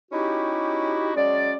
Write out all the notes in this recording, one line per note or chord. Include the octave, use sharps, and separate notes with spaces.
C#4 D#4 E4 F#4 G4
F#3 G#3 C#4 D5